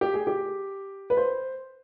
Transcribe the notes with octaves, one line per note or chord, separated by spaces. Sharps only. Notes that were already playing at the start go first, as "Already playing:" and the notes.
G4
G#4
G4
B4
C5